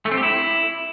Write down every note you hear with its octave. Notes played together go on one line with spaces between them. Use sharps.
A3
C4
G4
E4